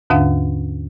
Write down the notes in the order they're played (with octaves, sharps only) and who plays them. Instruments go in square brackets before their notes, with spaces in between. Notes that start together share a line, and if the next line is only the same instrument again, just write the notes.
[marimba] D#2 G#2 D3 D4 F5 F#5